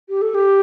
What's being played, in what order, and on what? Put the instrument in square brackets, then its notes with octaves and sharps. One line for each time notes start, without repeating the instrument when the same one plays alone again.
[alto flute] G4
A4
G4